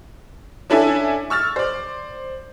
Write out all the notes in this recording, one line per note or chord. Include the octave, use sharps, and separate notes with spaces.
C#4 D4 E4 A4 E5 G#5
C#6 E6 F6 A6
C5 D5